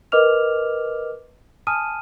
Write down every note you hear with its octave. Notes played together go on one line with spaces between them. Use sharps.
A#4 B4 D#5 D6 F6 F7
G#5 A5 D#6 F6 D#7